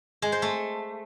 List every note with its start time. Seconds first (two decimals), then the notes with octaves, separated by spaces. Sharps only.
0.22 G#3
0.32 C5
0.42 A3